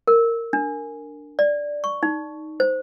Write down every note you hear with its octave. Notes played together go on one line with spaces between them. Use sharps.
A#4
D4
D5
C#6
D#4
C5